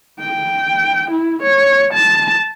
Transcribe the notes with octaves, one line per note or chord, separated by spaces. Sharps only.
G5
E4
C#5
A5